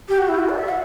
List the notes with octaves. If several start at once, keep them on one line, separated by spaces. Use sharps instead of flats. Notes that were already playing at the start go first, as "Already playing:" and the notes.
G4
F#4
E4
F#4
D5
E5
F#5